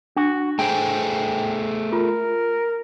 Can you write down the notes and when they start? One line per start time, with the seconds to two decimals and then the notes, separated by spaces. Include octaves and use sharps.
0.17 D4 F#4
0.59 A3 G#4 C5 G5
1.92 F4 A#4